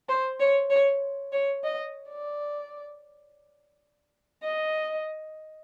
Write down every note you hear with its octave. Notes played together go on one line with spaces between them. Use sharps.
C5
C#5
C#5
C#5
D#5
D5
D#5